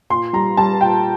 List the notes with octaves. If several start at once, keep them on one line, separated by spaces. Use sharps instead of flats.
A#2 C6
G3 A#5
G3 A5
A#2 G5